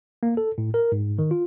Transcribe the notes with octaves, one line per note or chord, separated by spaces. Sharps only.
A#3
A4
A2
A#4
G#2
D#3
F4